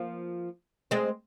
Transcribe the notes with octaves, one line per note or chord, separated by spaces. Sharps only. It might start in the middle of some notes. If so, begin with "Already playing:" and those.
Already playing: F3 A#3
G#3 C4